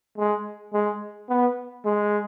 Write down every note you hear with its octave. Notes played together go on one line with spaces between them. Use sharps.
G#3
G#3
B3
G#3